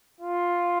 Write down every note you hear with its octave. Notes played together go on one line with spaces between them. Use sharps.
F4